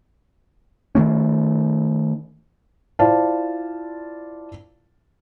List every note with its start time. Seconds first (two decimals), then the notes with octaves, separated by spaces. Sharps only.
0.95 D#3 E3 A3 C#4
2.99 E4 F4 C5 D5 F5 A5